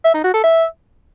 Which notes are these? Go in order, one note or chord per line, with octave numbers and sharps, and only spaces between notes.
E5
D#4
F#4
A4
E5